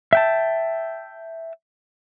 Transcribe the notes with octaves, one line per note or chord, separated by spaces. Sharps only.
E5 G5 A5